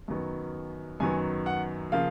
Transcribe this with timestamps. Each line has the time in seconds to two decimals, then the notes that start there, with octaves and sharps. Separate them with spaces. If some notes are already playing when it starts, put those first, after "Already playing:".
0.08 F#2 D#3 F#3 B3
1.00 F#2 D#3 F#3 B3 G#5
1.46 F#5
1.92 C#3 F3 A#3 F5